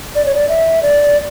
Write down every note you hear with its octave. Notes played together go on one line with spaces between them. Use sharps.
D5
C#5
D5
E5
D5